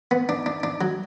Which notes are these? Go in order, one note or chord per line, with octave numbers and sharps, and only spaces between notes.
B3
D4
D4
D4
F#3